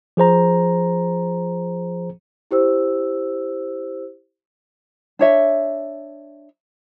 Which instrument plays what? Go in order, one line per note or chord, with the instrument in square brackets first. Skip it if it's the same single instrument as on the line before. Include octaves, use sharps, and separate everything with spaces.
[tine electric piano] F3 G#4 C5 A#5
[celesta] E4 G4 C5 E6
[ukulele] D4 C#5 E5